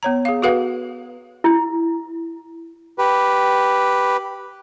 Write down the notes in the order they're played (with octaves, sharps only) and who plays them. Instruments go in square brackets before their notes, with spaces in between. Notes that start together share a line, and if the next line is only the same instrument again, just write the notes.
[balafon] B3 C#5 A#5
G#4 F5
F#4 G#4 A4 B4 F5 F#5
[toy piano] E4
[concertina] G4 B4